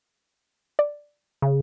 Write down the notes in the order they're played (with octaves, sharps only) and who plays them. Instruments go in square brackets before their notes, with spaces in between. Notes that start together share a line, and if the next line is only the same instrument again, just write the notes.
[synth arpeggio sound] D5
[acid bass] C#3